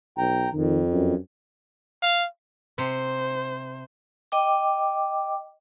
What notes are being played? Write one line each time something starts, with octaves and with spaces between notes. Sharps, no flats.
B1 G5 A#5
F2 D#3
F#2
F5
C3 C5
D#5 G5 D6